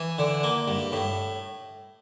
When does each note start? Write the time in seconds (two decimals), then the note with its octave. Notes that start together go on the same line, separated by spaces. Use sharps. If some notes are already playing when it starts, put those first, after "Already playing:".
Already playing: E3
0.19 D3
0.43 A#3
0.68 G2
0.92 A2